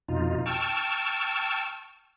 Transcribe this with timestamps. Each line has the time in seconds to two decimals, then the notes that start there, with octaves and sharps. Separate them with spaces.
0.09 F2 B2 D#4 F4
0.46 G5 A5 C#6 E6 F6